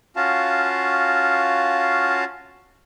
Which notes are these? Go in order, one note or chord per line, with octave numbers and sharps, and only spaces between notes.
C#4 F4 F#4 F5 A5